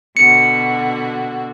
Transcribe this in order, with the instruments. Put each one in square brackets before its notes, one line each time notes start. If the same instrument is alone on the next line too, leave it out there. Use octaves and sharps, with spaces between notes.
[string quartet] B2 D3 F#4 [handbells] C#7